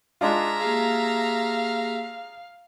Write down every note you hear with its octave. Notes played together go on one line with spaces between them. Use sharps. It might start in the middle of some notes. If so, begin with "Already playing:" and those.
G#3 D4 F4 E5 A#5
A#3 G4 G#4 F5